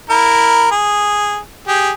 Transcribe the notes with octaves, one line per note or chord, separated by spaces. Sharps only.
E4 A#4
G#4
G4 G#4